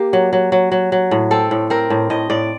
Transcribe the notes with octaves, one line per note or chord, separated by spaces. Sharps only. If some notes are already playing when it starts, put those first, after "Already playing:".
Already playing: A#3 G4
F#3
F#3
F#3
F#3
F#3
A2
C4 A4
A2
C4 A#4
A2
A2 D#5
A2 D5